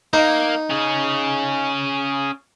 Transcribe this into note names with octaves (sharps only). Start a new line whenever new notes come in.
A#3 D#4
C#4 G#4